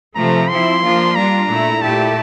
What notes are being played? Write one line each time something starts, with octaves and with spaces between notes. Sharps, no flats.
C3 F3 A3 A#5
F3 C4 E4 C6
F3 A#3 D4 F4
G3 D4 F4 A#5
A#2 A3 E4
A#2 A3 E4 G4 A5